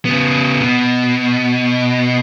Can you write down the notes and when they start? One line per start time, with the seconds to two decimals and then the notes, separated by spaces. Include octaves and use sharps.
0.05 C#3 B3
0.62 B2